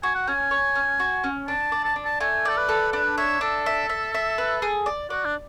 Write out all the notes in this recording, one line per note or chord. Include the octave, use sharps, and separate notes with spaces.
F#4 G#5
F#5
C#4 G#5
C#5
C#4
F#4
C#4
D4 A5
D5
A5
D4
A5
A3 G#5
A4 D5
B4
A4
D4 B4
C#5 E5
D4 A4
E5
E5
E5
B4
G#4
D5
F#4 D5
D4